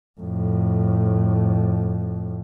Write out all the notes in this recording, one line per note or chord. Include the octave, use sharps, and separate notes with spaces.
F2 A2